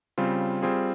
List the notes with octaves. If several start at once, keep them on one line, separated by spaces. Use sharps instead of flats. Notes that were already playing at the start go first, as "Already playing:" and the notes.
C#3 G3 C4 F4
G3 C4 F4 G#4